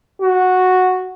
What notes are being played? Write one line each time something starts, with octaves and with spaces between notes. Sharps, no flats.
F#4